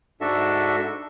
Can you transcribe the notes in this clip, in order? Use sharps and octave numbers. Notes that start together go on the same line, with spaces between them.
G#2 D4 F#4 A4 E5